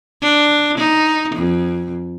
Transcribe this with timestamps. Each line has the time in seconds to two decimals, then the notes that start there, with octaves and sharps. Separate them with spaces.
0.23 D4
0.78 D#4
1.36 F2